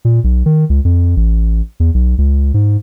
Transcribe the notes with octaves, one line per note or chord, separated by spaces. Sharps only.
A#2
B1
D#3
C#2
F2
A1
E2
B1
C#2
G#2